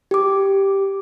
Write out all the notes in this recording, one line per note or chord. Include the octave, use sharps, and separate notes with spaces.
G4 D6